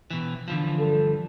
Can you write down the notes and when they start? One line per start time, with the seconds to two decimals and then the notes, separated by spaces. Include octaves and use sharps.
0.11 B2 E3
0.48 D3 E3 F3
0.79 G2 A4